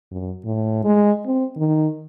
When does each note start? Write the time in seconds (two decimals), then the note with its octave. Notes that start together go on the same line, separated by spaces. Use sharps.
0.11 F#2
0.44 A2
0.84 G#3
1.26 C4
1.57 D#3